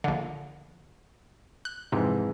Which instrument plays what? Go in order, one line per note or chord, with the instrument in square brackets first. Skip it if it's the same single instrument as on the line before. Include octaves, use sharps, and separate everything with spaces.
[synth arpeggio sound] A#1 D3
F#6
[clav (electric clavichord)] F2 G#2 E3 [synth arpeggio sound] C3